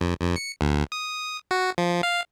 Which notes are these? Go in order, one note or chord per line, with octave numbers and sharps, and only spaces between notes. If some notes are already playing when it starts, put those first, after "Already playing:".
F2
F2
C#7
D2
D#6
F#4
F3
F5